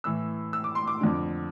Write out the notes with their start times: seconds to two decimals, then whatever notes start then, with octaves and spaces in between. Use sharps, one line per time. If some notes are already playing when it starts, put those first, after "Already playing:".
0.04 A2 E3 E6
0.53 E6
0.64 D6
0.75 C6
0.87 D6
1.01 F2 D3